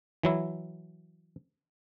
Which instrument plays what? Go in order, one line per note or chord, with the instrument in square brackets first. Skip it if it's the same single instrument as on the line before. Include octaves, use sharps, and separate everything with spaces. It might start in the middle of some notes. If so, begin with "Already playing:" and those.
[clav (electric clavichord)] E3 F#3 E4